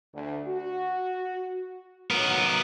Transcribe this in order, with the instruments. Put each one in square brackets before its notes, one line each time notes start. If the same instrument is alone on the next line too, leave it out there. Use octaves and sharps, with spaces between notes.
[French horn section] D2
F#4
[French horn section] A2 D#3 F#3 [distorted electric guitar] B3 A#4